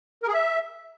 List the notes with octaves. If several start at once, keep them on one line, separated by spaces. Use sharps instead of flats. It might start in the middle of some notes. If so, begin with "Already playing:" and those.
A#4
G#4
E5